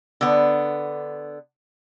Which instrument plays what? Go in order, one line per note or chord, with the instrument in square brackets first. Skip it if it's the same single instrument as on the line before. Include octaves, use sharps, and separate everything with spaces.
[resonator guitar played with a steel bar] D3 B3